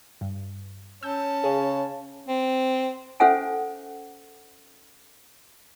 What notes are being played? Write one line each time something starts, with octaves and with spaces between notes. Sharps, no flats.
G2
C#4 A5 E6 G6
C#3 G#4
C4
C#4 A4 C5 E5 F#5 G#5